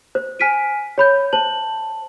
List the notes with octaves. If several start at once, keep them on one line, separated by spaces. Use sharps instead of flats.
C5
G#5 F6 B6 D7 D#7
C#5 B5 G6
C5 A5 F#7